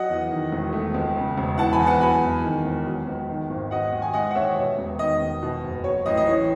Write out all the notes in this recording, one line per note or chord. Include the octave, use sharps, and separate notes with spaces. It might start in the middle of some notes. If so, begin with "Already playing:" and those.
Already playing: F#3 D#5 F#5
E2
D#3
E1
A3
C#2
C#3
E1
E3 F#5 A5
G#5 B5
E2
F#5 A5
F#3 G#5 B5
E2
D#3
E1
F#3
C#2
D#3
G#1
F#3 D#5 F#5
D#2
G#5
G#3 D#5 F#5
F#5
D#2 C#5 E5
B2 C#5
E1
D#3 D#5
E1
B2
F#1
F#3 C#5
A1 D#5
D#5
E3 C#5